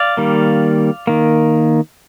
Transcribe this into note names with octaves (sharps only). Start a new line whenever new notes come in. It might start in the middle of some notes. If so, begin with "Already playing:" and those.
Already playing: D5 F5
D#3 G3 A#3
D#3 A#3